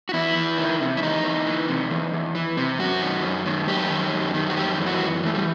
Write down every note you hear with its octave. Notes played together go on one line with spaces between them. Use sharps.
F#4
E2 E4
E2
D#3
C3
E4
E2 D#4
E2
E3
C3
E2
E2
E3
C3
F#2 F#4
D#3
F#2
D#3
F#2 G4
D#3
F#2
D#3
F#4
F#2 G4
E3
F#4
F#2
E3 A3
G3